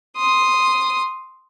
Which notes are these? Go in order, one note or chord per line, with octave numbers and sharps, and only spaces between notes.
C6 D#6